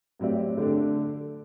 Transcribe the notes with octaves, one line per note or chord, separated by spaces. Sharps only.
A2 F#3 C4 G4 D5
D3 A3 D4